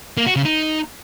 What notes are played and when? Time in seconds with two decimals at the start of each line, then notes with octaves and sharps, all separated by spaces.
0.17 A#3
0.27 F#4
0.36 C#3
0.45 D#4